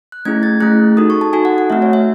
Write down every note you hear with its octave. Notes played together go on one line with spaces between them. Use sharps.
F#6
A3 C#4 E4 G#4 G#6
A6
A3 C#4 E4 G#4 F#6
D#4 F#4 A4 D#6
C#6
A5
D#4 F#4 A4 G#5
F#5
F#5
A3 C4 F#4 E5
C#5
E5